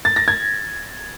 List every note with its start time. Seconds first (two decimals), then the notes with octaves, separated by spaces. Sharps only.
0.05 A6
0.16 A#6
0.28 G#6